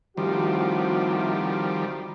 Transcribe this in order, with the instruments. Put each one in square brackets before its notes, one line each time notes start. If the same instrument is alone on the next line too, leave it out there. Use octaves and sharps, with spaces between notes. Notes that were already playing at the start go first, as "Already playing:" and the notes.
[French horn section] A2 C3 F#4 [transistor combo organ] D#3 F3 G3